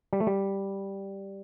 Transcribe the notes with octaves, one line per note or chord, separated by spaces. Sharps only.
G3
A3
G3